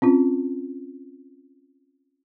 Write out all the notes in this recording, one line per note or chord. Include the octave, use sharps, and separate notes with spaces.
C4 C#4 F4